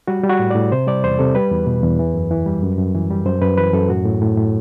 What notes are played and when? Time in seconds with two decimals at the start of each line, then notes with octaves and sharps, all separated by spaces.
0.07 G3 F#4
0.24 G3
0.30 F#4
0.39 A2
0.50 A2 D5
0.72 C3 C5
0.87 G3 D5
1.04 E2 C5
1.19 C3 A4
1.35 G3 B4
1.51 E2
1.66 B2
1.83 E2
1.99 E3
2.14 F#2
2.31 E3
2.46 G3
2.62 F#2
2.78 F#2
2.95 E3
3.10 G3
3.25 F#2 C5
3.41 F#2 B4
3.58 E3 B4
3.73 F#2 A4
3.89 A2 F#4
4.05 A2
4.22 A2
4.37 A2